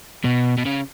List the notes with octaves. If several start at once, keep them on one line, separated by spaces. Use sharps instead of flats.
B2
B2
C#3